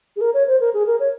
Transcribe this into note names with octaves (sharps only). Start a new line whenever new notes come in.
G#4
A#4
C#5
C5
A#4
G#4
A#4
C#5